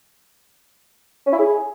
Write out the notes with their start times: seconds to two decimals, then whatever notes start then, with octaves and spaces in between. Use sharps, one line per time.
1.26 C#4
1.32 E4
1.39 G#4